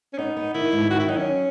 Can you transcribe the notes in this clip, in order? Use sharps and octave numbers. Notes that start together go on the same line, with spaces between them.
C#4
B3 D#4
B3
D#3 E4
G#2
D#3 F#4
E4
F#3 D#4
C#4